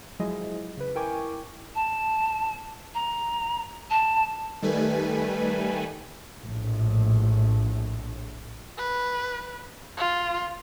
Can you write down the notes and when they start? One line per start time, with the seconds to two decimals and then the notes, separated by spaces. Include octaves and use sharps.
0.19 F3 F#3 G#3 E4 G#4 D#5
0.77 C#3 B4
0.95 E4 A#4 G5 G#5 C#6 D6
1.75 A5
2.94 A#5
3.90 A5
4.62 D#3 G3 A3 B4 G#5
6.42 A#1 A2
8.78 B4
9.97 F4